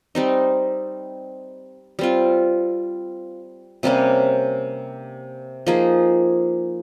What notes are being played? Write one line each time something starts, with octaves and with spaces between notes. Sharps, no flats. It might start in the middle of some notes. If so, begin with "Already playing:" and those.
G3 C4 D#4
G3 C4 F4
C3 G3 A#3 C#4
F3 A#3 D#4 G#4